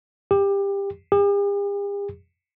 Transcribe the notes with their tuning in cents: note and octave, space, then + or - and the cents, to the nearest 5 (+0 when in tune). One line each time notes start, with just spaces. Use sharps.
G4 +20
G4 +45